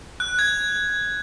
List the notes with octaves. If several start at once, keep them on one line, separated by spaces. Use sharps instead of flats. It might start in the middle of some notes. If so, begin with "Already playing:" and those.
F#6
G#6